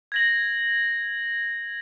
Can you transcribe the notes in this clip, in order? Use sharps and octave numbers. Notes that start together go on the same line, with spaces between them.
G#6 A#6 F#7